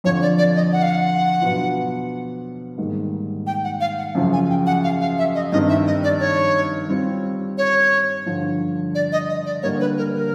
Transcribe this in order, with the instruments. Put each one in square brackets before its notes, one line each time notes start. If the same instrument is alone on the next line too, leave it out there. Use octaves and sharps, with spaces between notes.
[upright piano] F2 D3 F3 [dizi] C#5
[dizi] D5
D5
D#5
F#5
F5
F#5
[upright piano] B2 F#3 B3 D4 F4
G#2 D#3 G3 A#3
[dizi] G5
F#5
F5
F#5
[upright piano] F#2 C#3 F3
[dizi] G#5
G5
F#5
F5
F5
E5
D#5
[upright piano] G2 D#3 G3 C4 D#4 [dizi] D#5
[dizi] E5
D#5
D5
C#5
[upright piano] G3 C4 F4
[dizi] C#5
[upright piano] G2 D3 F3
[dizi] D5
D#5
D#5
D5
[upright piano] D3 G3 A#3 [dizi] C#5
[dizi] B4
A#4
A#4